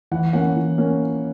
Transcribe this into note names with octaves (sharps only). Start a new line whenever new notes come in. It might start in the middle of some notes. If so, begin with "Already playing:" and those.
E3 F#5
A#3 C#4 F#5
E3
A#3 C#4